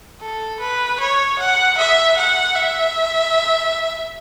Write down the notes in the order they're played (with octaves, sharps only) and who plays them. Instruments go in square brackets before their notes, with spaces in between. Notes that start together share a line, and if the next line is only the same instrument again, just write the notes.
[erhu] A4
B4
C#5
F#5
E5
F#5
E5